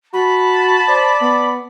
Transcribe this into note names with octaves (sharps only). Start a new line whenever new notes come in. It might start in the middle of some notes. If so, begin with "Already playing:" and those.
F#4 A5 B5
C5 D5
B3